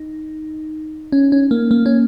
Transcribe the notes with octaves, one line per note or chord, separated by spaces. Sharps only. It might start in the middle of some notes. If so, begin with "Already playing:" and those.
Already playing: D#4
C#4
C#4
A#3
A#3
C#4